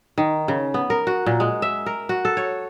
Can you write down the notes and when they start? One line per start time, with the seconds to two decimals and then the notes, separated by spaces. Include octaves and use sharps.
0.18 D#3
0.48 C#3
0.74 B3
0.90 A#4
1.07 F#4
1.26 A#2
1.40 G#3
1.62 E5
1.86 A#4
2.09 F#4
2.25 A4
2.37 C#5